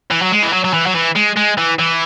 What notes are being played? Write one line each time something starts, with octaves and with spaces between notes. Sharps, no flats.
E3
F#3
G#3
E3
F#3
F#3
E3
F#3
E3
G#3
G#3
E3
E3